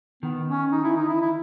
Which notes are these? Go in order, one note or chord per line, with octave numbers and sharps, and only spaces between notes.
D#3 B3
C#4
D#4
E4
D#4
E4
E4